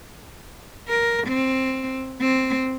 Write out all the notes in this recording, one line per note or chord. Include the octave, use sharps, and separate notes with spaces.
A#4
C4
C4